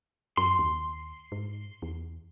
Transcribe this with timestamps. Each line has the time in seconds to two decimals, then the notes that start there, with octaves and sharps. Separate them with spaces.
0.37 F#2 C6
0.59 D#2
1.32 G#2
1.82 E2